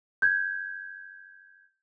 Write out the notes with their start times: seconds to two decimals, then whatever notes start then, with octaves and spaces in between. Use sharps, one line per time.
0.22 G6 G#6